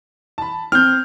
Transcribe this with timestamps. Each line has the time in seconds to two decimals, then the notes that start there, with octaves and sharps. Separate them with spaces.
0.38 A5 B5
0.72 C4 F6 G6